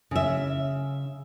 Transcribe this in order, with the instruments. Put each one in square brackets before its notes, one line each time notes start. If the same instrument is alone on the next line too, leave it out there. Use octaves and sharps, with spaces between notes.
[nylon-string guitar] C#3 E5